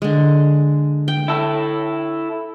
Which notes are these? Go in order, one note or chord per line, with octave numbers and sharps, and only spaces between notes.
D3 G#3
G5
E4 A4